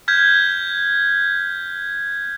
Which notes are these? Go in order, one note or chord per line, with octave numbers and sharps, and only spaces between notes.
F6 G6 G#6 B6